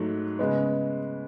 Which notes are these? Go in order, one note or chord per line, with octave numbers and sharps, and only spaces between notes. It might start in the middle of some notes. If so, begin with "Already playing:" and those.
Already playing: G#2 F#3 A3
C#3 G#3 B3